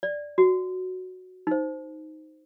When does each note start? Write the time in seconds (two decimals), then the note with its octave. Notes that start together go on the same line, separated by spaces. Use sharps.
0.03 D5
0.38 F#4
1.47 D#4 C5